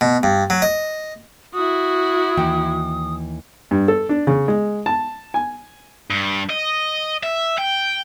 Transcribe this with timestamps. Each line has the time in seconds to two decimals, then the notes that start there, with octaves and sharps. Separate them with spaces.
0.01 B2
0.23 G2
0.50 F#3
0.62 D#5
1.54 E4 F#4 D#6
2.37 D#2 E3 G5
3.71 G2
3.88 A4
4.09 D4
4.27 C#3
4.48 G#3
4.86 A5
5.34 G#5
6.10 G2
6.50 D#5
7.23 E5
7.58 G5